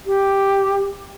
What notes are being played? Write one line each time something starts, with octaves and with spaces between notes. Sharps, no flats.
G4